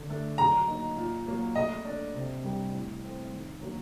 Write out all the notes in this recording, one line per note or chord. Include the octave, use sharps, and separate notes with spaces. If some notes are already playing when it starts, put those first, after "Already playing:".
Already playing: D3
A3 D4 A4
F#3 A#5
A#3 D#4
A#2
F#3 A#3
A3 D#5
D4 A4 D5
C3
G3 D4 G4 A#4
A2
A3 C4
D#3
F#3 A#3 D4 F#4